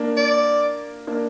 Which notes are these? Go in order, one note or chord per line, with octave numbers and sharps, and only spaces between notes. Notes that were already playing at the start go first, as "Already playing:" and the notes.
Already playing: A#3 D4
D5
A#3 D4